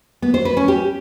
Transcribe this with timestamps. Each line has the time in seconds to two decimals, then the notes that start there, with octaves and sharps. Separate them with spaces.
0.22 B3
0.34 C5
0.45 B4
0.57 C#4
0.68 G4